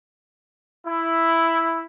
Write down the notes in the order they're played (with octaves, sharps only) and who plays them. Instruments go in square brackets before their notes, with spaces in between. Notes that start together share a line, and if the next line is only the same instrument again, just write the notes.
[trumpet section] E4